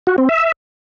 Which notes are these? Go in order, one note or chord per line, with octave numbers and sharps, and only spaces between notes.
F#4
C4
E5